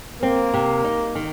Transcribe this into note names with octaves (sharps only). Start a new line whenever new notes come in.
A#3 C4
C3
D#4
D#3